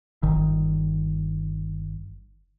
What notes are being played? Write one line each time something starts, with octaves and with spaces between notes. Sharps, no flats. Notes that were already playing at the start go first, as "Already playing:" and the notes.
G1 D#3